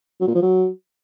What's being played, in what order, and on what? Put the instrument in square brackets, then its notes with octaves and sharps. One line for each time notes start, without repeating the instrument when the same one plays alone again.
[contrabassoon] F#3
A#2
F3
F#3